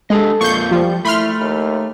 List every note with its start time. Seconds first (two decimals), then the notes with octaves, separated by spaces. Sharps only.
0.10 G#3 D4 G4 A4 D#5
0.41 F2 A#3 F4 C#6 G6
0.71 F3 G3
1.05 A3 E4 B5 C6 F6
1.41 D#2